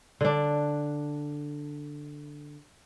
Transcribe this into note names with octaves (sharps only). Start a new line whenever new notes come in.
D3 D4